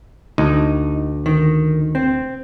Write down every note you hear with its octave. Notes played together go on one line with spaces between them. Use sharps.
D2 D#4
D#3
C4